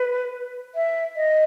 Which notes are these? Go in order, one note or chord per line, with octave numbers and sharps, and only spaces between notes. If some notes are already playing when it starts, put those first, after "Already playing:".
Already playing: B4
E5
D#5